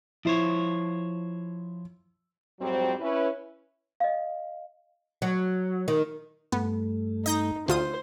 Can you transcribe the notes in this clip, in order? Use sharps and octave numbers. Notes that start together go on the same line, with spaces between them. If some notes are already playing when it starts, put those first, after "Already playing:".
F3 E4 C5 C#5
F2 G#2 F#3 G3 C4
C#4 E4 B4
D#5 F5
F#3
D#3
G2 A3 B3
D#4 D#5 G6 A#6
D2 F4 C5 D#6